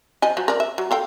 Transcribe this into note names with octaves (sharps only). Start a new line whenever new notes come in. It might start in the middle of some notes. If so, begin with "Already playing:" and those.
F3 D#5 G#5
F3 F#3
A#4 D5
E5
F#3
A4 F5 G5